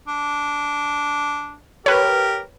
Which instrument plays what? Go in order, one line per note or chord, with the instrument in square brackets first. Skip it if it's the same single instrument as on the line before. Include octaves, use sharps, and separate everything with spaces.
[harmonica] D4
[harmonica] G4 A#4 [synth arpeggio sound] B4 C#5